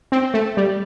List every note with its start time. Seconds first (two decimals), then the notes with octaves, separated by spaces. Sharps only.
0.12 C4
0.34 A3
0.57 G3